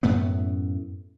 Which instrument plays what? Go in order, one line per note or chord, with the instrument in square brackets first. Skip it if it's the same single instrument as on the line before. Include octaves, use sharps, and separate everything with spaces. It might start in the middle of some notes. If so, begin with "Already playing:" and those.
[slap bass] F#2 A2 A3 B3